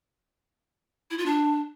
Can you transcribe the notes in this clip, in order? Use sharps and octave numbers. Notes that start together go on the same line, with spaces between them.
E4
F4
D4